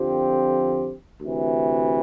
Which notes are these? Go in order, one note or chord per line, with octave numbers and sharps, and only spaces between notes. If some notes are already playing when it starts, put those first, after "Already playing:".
Already playing: F2 D3 F3 C4 G4
D2 C3 E3